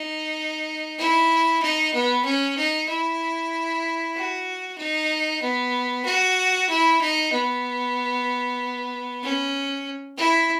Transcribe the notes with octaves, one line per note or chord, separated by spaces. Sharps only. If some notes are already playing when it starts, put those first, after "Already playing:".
Already playing: D#4
E4
D#4
B3
C#4
D#4
E4
F#4
D#4
B3
F#4
E4
D#4
B3
C#4
E4